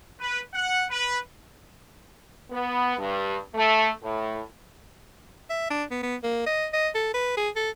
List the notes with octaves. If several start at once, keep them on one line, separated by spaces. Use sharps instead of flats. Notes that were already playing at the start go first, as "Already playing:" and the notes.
B4
F#5
B4
B3
G2
A3
A2
E5
D4
B3
B3
A#3
D#5
D#5
A4
B4
G#4
A4